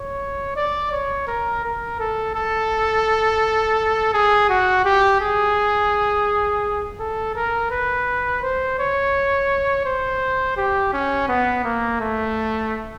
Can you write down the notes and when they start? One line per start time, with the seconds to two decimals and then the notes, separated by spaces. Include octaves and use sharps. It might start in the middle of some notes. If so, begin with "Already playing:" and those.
Already playing: C#5
0.56 D5
0.92 C#5
1.27 A#4
1.64 A#4
1.99 A4
2.35 A4
4.14 G#4
4.49 F#4
4.85 G4
5.21 G#4
7.00 A4
7.35 A#4
7.71 B4
8.42 C5
8.79 C#5
9.86 C5
10.57 G4
10.93 C#4
11.28 B3
11.64 A#3
12.01 A3